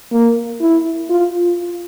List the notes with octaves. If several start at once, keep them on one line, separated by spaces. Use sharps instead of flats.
A#3
E4
F4